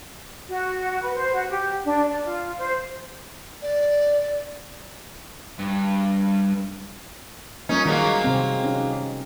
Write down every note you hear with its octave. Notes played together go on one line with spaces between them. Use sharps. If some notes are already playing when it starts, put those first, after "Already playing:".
F#4
B4
C5
F#4
G4
D4
D5
F4
C5
D5
G2
F3 G3 A#3 C#4 D#4
D#3 F#3 G#3 A#3
C3 C4
C#4 D#4